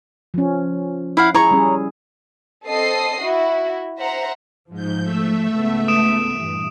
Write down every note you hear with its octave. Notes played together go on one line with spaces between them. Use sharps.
F3 C#4
E4 F5 F#5
E4 G#4 C#5 A#5 C#6
G3 C#4 G#4
C4 A4 D#5 D#6 C7
E4 F#4
C5 E5 F#5 A#5
G#2 F3 G6
A3 E5
C#2 G#2 B3
D#6 D7 E7
G2 A#2 E3